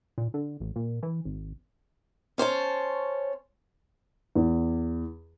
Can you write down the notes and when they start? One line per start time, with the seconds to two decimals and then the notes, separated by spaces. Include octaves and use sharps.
0.18 A#2
0.34 D3
0.60 A1
0.76 A#2
1.03 E3
1.25 G#1
2.38 C#4 C5 C#5 A5
4.35 E2